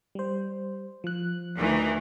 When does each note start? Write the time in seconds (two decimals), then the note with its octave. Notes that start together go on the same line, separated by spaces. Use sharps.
0.15 G3 C5
1.04 F3 F#6
1.57 D2 D#3 E3